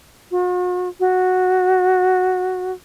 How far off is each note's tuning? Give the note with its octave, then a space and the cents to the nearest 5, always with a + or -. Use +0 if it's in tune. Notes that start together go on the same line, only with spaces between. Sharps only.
F#4 -45
F#4 -5